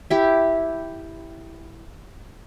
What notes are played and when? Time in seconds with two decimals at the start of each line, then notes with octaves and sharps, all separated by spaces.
0.10 E4 G4